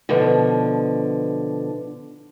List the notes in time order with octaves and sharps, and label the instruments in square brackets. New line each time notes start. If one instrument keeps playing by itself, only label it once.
[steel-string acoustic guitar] B2 D3 F3